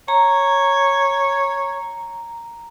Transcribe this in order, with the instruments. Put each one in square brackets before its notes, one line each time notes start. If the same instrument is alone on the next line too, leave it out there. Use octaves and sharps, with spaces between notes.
[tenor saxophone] C#5 [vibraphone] A#5